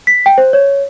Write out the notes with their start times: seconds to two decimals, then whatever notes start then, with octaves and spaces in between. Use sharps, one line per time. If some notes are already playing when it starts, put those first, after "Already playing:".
0.07 B6
0.26 G5
0.38 C5
0.53 C#5